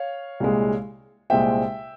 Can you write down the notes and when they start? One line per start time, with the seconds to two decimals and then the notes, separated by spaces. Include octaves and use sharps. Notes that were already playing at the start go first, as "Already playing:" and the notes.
Already playing: C#5 F5
0.40 C2 A#2 G#3
1.30 C2 A#2 G#3 C4 E5 G5